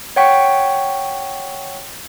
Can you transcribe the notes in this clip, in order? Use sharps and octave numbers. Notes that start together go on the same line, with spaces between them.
C#5 F#5 G5 C#6 B6